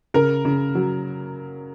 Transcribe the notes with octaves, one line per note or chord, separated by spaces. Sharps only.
C#3 A#4
C#3
F#3